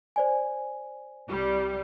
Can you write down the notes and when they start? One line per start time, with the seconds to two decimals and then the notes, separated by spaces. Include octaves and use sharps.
0.16 C5 D5 G#5
1.29 C2 G3